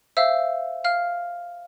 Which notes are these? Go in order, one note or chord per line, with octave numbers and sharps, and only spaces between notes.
C5 E5 F5 E6
F5 F6